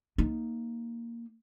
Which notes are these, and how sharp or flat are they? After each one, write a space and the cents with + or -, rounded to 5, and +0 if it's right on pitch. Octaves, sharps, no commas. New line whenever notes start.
A#3 +0 D#4 +0